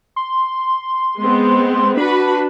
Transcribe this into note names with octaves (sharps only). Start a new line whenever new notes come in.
C6
G#3 B3 C4
D4 F#4 B4 B5